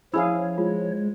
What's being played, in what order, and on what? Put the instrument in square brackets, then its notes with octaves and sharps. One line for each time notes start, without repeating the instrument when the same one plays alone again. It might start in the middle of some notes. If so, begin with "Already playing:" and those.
[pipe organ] F3 C#5 [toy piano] C#4 B5 E6 [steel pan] E4 G#4 F5
[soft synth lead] G#3 [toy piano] F4